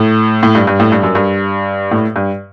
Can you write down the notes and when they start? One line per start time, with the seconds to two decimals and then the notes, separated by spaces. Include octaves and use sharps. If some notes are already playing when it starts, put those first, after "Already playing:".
Already playing: A2
0.43 A2
0.55 G2
0.67 G2
0.80 A2
0.92 G2
1.03 F#2
1.15 G2
1.91 A2
2.16 G2